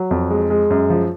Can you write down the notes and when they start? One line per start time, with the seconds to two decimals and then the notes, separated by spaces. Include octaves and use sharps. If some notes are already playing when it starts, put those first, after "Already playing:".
Already playing: F#3
0.11 F2
0.31 G#3
0.50 G#3
0.70 F#2
0.90 F3